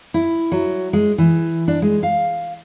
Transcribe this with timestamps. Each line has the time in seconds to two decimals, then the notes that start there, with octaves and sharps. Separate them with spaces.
0.14 E4
0.52 F#3
0.93 G#3
1.18 E3
1.68 D4
1.82 G#3
2.03 F5